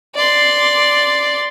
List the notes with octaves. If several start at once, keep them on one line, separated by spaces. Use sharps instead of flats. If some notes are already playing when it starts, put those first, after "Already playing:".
D5 C6